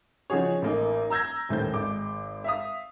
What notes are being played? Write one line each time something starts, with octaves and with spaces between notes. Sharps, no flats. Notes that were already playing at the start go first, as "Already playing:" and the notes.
C#3 F3 D#4 F#4 G#4 C#5
A1 A#3 D#4
A#5 E6 G6 G#6 A#6
D#1 A2 D#3 C5 G6
G#1 G#3 D6
E5 F5 D#6